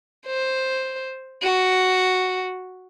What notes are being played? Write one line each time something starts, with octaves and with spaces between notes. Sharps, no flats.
C5
F#4